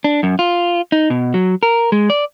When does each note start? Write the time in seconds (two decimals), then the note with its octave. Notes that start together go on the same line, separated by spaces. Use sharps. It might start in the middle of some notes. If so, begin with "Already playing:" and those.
0.04 D4
0.23 F#2
0.39 F4
0.92 D#4
1.10 B2
1.34 F#3
1.63 A#4
1.92 G#3
2.10 D5